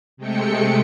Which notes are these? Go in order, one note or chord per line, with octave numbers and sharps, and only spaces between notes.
C3 G#3 A3 G5 C#7